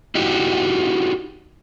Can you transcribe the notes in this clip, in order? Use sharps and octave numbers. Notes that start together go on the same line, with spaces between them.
D#4 E4 F#4 G4